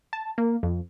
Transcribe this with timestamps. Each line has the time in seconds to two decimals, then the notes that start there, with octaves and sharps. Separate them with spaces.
0.13 A5
0.38 A#3
0.63 F2